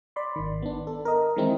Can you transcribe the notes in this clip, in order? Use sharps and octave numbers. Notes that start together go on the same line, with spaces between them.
D5 B5 C6
G#1 D#3
B3 D4
A4
A#4 D#5
D#3 E3 G#3 C4 D#4 E4